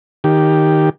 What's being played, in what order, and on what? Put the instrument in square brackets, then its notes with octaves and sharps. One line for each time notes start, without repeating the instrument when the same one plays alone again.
[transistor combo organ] D#3 G4